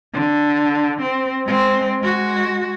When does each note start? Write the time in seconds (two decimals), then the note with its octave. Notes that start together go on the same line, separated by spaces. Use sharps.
0.14 D3
1.02 C4
1.46 G#3 C4
2.00 G#3 F#4